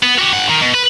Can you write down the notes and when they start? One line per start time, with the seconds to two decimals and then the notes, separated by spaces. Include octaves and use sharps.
0.03 B3
0.19 F#4 G4
0.33 G2 F#5
0.50 D#3
0.62 B2
0.74 B4